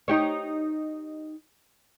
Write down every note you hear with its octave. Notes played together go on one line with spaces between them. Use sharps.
D#4 G4 C#5